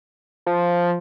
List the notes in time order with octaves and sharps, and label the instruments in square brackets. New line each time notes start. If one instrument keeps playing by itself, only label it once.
[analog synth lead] F3